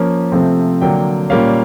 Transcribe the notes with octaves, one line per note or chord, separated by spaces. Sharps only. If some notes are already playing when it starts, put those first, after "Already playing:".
Already playing: F3 A#3 C#4
C3 F3 A3 C4
D3 F#3 A#3 D4 G5
A#2 G3 A#3 C#4 F5